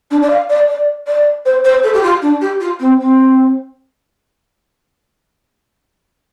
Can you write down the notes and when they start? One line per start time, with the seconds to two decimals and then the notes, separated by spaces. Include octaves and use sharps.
0.10 D4
0.22 D5
0.30 F5
0.49 D5
0.68 D5
1.07 D5
1.45 C5
1.64 C5
1.83 A4
1.93 G4
2.02 F4
2.21 D4
2.41 G4
2.60 F4
2.79 C4
2.99 C4